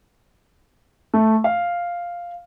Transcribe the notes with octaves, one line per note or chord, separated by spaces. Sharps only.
A3
F5